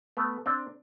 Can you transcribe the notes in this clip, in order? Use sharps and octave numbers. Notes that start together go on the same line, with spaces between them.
A3 B3
C4 D4